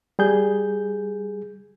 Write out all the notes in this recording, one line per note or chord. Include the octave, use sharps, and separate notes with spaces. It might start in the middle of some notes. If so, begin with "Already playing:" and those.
G3 G#4 G6